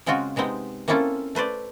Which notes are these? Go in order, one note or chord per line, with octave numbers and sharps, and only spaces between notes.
C#3 G#3 C4 F4 F#4
C3 G#3 B3 C4 D#4
A#3 C4 C#4 E4 F4 A4
A3 B4 C5 D5